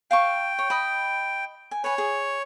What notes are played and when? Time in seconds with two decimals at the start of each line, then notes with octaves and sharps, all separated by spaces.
0.11 F5 G5 A5 C#6
0.59 C#5
0.70 D#5 B5
1.71 G#5
1.84 B4 C#5 G#5
1.98 G#4